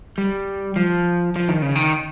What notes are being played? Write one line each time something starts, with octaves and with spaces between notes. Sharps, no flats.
G3
F3
F3
D#3
C#3
D#3